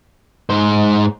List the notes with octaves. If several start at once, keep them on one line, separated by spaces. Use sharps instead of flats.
G#2 C5